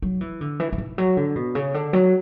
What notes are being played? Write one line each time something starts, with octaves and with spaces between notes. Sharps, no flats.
F#3
E3
D3
E3
D3
E3
F#3
D3
B2
C#3
D3
F#3